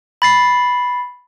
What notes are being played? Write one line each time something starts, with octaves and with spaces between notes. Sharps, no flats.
B5 A6 C7